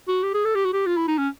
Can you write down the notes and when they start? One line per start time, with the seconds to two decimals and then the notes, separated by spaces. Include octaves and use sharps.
0.08 F#4
0.23 G4
0.34 G#4
0.45 A4
0.55 G4
0.65 F#4
0.73 G4
0.86 F4
0.97 E4
1.08 D#4
1.18 C#4